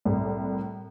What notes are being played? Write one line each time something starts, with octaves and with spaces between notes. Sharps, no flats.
C2 A2